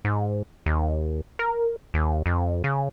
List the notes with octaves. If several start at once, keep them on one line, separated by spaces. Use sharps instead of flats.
G#2
D#2
A#4
D#2
F2
C#3